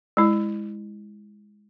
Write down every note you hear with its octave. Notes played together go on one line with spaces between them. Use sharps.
G#3 E4